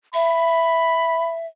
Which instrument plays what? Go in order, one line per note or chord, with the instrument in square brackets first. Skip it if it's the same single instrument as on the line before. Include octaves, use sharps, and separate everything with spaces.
[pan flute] E5 [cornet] B5